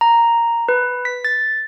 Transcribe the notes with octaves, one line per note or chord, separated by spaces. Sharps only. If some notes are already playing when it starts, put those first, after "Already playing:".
A#5
B4
B6
A6